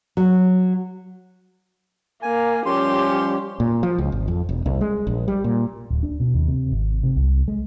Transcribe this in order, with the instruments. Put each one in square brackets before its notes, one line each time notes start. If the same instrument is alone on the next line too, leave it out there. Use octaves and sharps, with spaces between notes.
[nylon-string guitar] F#3
[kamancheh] A#3 [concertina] G#5
[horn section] F3 G3 C#4 [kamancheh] G4 [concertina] C6
[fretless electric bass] A#2
F3
C#2
G#1
F2
E1
C2
G#3
A#1
G3
A#2
[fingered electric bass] D1
D4
B2
D#2
C3
G#1
C3
C2
G#3